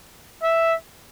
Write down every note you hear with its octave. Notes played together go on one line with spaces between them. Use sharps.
E5